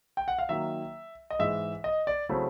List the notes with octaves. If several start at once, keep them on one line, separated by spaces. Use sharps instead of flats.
G5
F#5
F5
D#3 F#3 A#3 E5
D#5
G#2 E3 G#3 E5
D#5
D5
C#3 F#3 A3 C4 E4